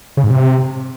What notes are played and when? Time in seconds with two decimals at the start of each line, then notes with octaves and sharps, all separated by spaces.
0.17 C#3
0.24 G#2
0.30 C3